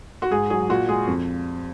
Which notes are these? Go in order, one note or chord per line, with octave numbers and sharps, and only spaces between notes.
F#4
G#2 G#4
F#3 G#4
A#2 F#4
G#3 G#4
F2